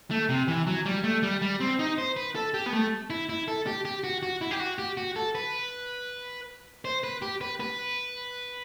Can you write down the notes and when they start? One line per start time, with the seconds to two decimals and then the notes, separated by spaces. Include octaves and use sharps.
0.11 A3
0.29 C3
0.48 E3
0.67 F#3
0.85 G3
1.04 A3
1.23 G3
1.42 G3
1.60 C4
1.79 D#4
1.98 C5
2.16 B4
2.35 A4
2.54 G4
2.66 B3
2.73 A3
3.10 E4
3.29 E4
3.48 A4
3.67 G4
3.85 G4
4.04 F#4
4.23 F#4
4.41 E4
4.51 G4
4.60 F#4
4.79 G4
4.97 F#4
5.16 A4
5.35 B4
6.85 C5
7.03 B4
7.22 G4
7.41 B4
7.60 B4